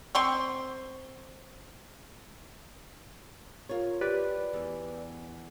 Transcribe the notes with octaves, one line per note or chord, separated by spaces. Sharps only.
C4 C6 C#6
F4 A#4 C#5
G4 B4 D5
E2